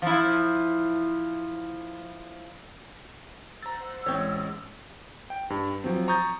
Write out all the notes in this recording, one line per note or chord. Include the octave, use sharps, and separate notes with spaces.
F3 E4
C5 F#5 A#5 E6 A6
A1 G#3 C4 C#4 C#5 D5 C#6 G#6
G5
G2
F3 F#3 C4
A#5 C#6 D#6 G6 A6